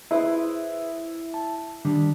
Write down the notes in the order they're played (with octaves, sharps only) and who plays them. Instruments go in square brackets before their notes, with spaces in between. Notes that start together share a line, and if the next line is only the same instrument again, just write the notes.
[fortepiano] E4 [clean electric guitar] G#4 B4 C5
[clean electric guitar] A5
D#3 G3 D4